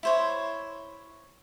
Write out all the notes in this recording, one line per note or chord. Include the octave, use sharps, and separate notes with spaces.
E4 C5 C#5